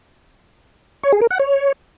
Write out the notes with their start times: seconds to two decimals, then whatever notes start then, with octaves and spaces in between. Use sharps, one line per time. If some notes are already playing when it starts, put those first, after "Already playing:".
1.03 C#5
1.12 G#4
1.21 A#4
1.30 F#5
1.39 C#5